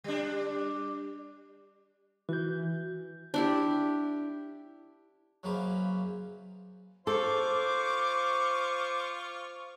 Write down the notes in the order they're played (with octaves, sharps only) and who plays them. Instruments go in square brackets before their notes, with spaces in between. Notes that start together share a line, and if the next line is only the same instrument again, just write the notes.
[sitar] G3 D4
[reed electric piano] E3 G6 [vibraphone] F#4
[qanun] D4 E4 G4
[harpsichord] F#2 C#3 F#3 A#3 B4 C5
[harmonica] F4 C#6 [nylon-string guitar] A4 [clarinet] C5 [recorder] D6